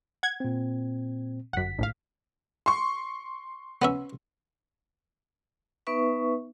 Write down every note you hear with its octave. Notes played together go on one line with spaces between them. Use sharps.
F#5 G#6
A#2 C4
G1 F#2 F#5 B6
A#1 A2 F5
C6 C#6
B3 C#4 E5
B3 D#4 B4 E5 C#6